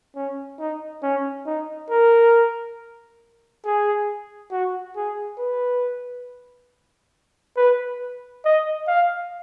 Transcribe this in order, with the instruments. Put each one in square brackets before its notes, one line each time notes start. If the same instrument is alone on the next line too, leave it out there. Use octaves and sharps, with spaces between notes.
[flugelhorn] C#4
D#4
C#4
D#4
A#4
G#4
F#4
G#4
B4
B4
D#5
F5